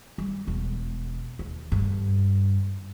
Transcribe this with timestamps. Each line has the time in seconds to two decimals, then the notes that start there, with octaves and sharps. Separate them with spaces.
0.18 G3
0.47 E1 D3
1.39 D#2
1.72 G2 D3